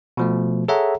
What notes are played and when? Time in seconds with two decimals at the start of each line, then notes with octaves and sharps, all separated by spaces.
0.17 B2 F3 A3
0.68 G#4 A4 C#5 E5 F#5 A#5